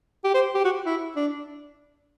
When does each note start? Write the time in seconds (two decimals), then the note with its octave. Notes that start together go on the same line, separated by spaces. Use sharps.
0.24 G4
0.34 C5
0.55 G4
0.65 F#4
0.86 E4
1.16 D4